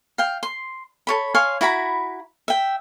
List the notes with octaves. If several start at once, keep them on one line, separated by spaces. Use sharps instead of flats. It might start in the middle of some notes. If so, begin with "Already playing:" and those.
F5 G5
C6
A4 C#5 B5
C#5 F5 G#5 C6
E4 F#4 A#5 B5
E5 G5